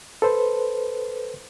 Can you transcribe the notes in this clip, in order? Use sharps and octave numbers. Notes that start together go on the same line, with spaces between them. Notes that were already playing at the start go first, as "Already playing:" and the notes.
A4 B4 C5